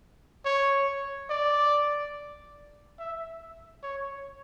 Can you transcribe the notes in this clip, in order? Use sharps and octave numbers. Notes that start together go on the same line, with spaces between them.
C#5
D5
E5
C#5